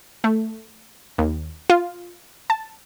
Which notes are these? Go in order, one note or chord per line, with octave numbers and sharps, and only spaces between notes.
A3
D#2
F4
A5